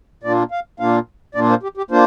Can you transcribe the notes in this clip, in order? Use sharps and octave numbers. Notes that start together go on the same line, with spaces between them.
A#2 A#3 D4 F4 D5
F5
A#2 A#3 D4 F4 F5
A#2 A#3 D4 F4 D5
C5
G4
G4
A#3 D4 F4 C5